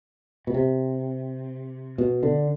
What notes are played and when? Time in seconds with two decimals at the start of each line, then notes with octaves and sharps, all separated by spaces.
0.47 B2
0.54 C3
1.98 B2
2.23 D3